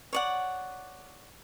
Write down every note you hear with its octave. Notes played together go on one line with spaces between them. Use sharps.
C#5 D5 F#5